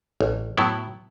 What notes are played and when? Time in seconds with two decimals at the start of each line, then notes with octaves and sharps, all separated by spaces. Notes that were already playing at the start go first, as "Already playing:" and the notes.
0.21 A1
0.57 A2 F#3 B3 E4